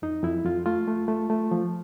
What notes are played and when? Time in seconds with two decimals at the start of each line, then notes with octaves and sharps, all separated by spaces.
0.02 F2 D#4
0.23 F2 E4
0.45 F2 F4
0.66 A3 F4
0.88 A3
1.08 A3
1.30 A3
1.51 F3